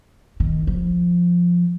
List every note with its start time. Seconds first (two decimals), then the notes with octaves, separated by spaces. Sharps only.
0.40 D#3
0.67 F3